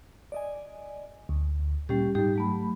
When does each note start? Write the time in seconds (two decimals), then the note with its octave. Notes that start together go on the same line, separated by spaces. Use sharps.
0.32 D5 D#5 G#5
1.29 D2
1.89 A#2 G3 C#4 G4
2.15 G#2 G3 D#4 G4
2.36 F#3 A3 B5